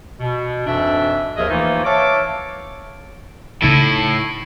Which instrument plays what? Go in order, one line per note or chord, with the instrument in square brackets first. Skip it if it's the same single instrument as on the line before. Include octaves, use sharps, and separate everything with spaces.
[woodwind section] B2
F2 G#2 B2 E3 D4 E5
D#2 F3 G#4 A#4 D#5 E5
E3 F3 A3 A#3 D#4 F4
C#5 E5 F5 A5 D6
[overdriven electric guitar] A2 E4 [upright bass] C#3 D#4